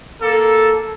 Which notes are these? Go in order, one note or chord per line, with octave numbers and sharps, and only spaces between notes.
A#3 A4